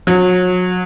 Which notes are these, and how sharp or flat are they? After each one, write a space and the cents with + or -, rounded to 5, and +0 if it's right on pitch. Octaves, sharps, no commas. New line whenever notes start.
F#3 -30